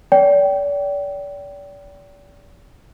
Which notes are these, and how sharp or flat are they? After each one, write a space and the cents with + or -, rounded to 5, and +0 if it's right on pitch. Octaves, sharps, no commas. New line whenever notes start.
D5 -40 G5 -15